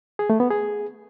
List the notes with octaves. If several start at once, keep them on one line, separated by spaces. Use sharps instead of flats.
G#4
A3
B3
G#4